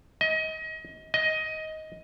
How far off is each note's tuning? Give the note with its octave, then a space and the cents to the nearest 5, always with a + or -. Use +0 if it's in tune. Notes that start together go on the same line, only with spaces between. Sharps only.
D#5 +30
D#5 +15